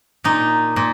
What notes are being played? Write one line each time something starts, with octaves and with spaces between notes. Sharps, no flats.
A#2 D#4
A#2